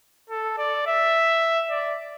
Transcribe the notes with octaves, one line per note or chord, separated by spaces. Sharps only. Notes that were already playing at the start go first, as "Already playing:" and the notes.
A4
D5
E5
D5